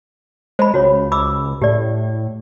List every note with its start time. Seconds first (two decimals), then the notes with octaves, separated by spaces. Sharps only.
0.59 G#3 C5 B5
0.74 C#2 F#4 C#5
1.12 B5 D6 E6
1.62 A2 G4 D5